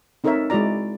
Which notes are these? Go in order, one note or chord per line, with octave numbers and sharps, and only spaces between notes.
C4 D#4 A4 A#4 C#5 E5
G#3 E4 F#4 D5 A#5